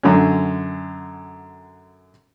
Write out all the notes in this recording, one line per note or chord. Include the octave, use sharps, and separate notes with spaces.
F#2 D3 C#4